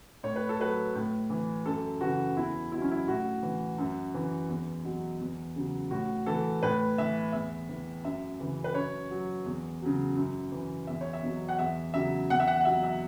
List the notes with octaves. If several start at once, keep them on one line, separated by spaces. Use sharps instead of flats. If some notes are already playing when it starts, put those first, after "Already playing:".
A2 C#5
B4
A4
F#3 B4
A2
E3
F#2 A4
C#3 E3 F#4
E2 E4
B2 F#3 E4
C#4
E4
A2 F#4
E3
F#2
E3
E2
B2 F#3
E2
C#3 F#3
A2 F#4
E3 A4
A2 B4
E3 E5
E2 E5
E3
F#2 E5
C#3 E3
B4
F#2 C#5
F#3
E2
C#3 F#3
F#2
E3
E2 E5
C#5
E5
B2 F#3
F#5
E2 E5
C#3 F#3 E5
E2 F#5
E5
F#5
F#5
B2 F#3 E5
E5